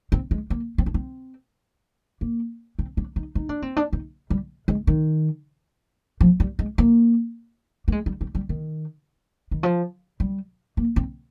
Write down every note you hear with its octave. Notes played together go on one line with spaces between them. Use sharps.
C4
G#3
A#3
C4
D4
C4
A#3
C4
D4
D#4
D#4
D4
C4
D4
D#4
G3
G#3
D#3
F3
G3
G#3
A#3
A#3
G#3
G3
G3
G3
D#3
D#3
F3
G3
A#3
C4